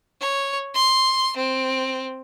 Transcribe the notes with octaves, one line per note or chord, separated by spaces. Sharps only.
C#5
C6
C4